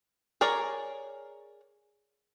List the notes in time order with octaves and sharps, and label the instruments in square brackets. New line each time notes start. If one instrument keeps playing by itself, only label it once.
[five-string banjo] G#4 A#4 C#5 D5